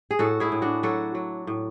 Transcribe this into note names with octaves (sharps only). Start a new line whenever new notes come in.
G#4
A2 F#4 A4
E4 G#4
A2
D4 F#4
F#3 F#4 A4
F#3
A2